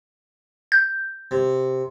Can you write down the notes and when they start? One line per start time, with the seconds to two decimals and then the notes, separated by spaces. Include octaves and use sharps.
0.72 G6
1.31 C3